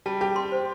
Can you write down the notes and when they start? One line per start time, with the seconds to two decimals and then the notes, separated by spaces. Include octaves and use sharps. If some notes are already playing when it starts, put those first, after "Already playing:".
0.06 G3 A5
0.21 G4 A5
0.36 C6
0.52 C5